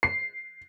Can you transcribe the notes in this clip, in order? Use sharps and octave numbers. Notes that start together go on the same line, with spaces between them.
C7